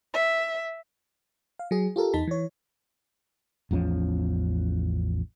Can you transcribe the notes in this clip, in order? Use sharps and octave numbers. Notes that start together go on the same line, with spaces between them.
E5
F5
F#3 G#4
F4 G4 A4 A#4
E2 D#4 A5 B6
E3 C#5
A1 E2 F3 C#4